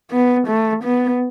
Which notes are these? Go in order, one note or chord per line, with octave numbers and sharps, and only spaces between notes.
B3
A3
B3